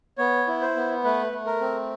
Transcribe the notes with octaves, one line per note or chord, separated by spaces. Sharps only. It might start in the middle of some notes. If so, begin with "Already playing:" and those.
B3 C#5
E4
C5
B3
A3 B4
A3
A#4
C4